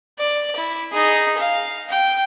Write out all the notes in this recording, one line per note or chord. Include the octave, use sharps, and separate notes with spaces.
D5
E4
D#4 G#4
F5
G5